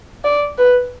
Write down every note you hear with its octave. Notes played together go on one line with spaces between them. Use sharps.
D5
B4